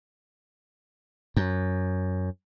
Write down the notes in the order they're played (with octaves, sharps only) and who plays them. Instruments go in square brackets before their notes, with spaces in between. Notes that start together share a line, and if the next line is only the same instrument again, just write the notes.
[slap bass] F#2